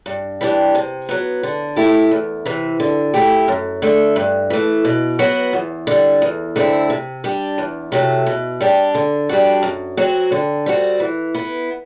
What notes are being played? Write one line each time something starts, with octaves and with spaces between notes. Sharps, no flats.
G2
E3 G3 D4 G4
C3
F#3 B3
D3
A3 E4 G4
E2
C3 E3
D3
A3 E4 G4
F#2
D3 A3
G2
E3 A3
B2
F#3 B3 F#4
E2
D3 G3
E2
D3 A3 C4 E4
C3
G3 D4 G4
E2
C3 F#3 A3
B2
G3 D4 G4
D3
G3 D4 F#4
F#2
F#3 C4 F#4
D3
G3 C4 F#4
E3
B3 E4